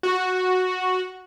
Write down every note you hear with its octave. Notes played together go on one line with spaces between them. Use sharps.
F#4